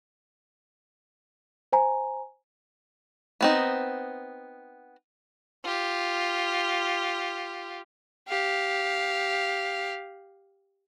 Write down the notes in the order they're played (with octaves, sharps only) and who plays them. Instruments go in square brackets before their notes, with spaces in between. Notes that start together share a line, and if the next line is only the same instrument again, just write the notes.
[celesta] C5 G#5 A#5
[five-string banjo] B3 C4 D#4
[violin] F4 G4
[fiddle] G4 F5